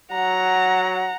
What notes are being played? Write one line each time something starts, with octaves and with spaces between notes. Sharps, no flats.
F#3 F#5 A#5